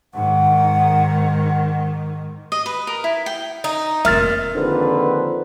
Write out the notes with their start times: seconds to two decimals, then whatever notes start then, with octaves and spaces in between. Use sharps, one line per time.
0.14 G#2 D#3 F#5
2.52 D#5
2.66 B4
2.87 A#4
3.04 E4
3.26 G5
3.64 D#4
4.05 F1 A#2 F#3 E5 F6 A6
4.54 A#1 F2 D3 D#3 B4 C5